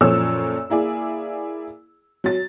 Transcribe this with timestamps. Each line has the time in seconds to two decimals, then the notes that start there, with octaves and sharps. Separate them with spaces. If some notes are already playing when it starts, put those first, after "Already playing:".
0.01 F#2 A#2 F3 A4 C#5 E6
0.70 A#3 E4 G#4 D5
2.24 F#3 A6